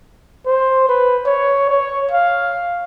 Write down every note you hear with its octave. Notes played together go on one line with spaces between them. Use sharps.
C5
B4
C#5
C#5
F5